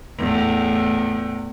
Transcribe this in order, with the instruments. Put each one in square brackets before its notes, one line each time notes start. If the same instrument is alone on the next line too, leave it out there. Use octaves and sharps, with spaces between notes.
[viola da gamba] E2 A2